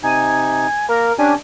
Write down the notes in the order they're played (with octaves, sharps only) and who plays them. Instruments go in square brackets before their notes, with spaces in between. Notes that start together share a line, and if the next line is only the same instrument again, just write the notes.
[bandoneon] C3 D#4 [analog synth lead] G#5
[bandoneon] A#3 [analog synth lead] A#4
[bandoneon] C#4 G4 G#5 [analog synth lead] D4